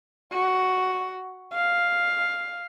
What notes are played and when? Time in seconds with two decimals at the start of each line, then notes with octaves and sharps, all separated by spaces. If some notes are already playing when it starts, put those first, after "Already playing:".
0.32 F#4
1.53 F5